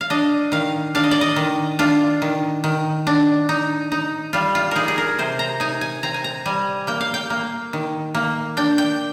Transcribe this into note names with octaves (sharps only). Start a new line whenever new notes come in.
F5
D4 D#5
D#3 F5
D4 F5
D#5
D5
D#5
D#3
D4 F4
D#3
D#3
D4
D#4
D#4
G3 F4
F4
D#4 G#4 A#4
G#4
A#4
C3 C5
A#5
D#4 G#5
G#5
C4 A#5
G#5
A#5
G3 G#5
A#3 G5
F5
G5
A#3
D#3
A#3
D4 G5
G5